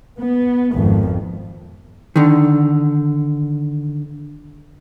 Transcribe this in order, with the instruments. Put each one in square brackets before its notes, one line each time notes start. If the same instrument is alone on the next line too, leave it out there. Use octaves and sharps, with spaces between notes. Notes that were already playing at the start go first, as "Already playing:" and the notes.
[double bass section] B3
G#1 F2
[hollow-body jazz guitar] D3 D#3